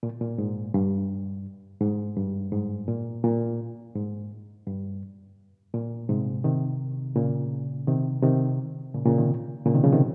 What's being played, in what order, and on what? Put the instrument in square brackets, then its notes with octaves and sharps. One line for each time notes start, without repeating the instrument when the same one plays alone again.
[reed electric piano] A#2
A#2
G#2
G2
G#2
G2
G#2
A#2
A#2
G#2
G2
A#2
G#2 C3
C3 D#3
A#2 C#3
C3 D#3
C3 D#3
A#2 C#3
A#2 C#3
C3 D#3
A#2 C#3
C3 D#3
C#3 F3
C3 D#3